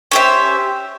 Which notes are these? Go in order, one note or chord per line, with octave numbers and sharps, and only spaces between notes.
C#4 G4 C5 E5